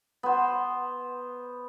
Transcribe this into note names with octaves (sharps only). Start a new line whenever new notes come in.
B3 C5